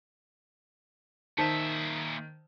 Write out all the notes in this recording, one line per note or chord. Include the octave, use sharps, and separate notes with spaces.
A#2 D#3 C5 D5 E5 A5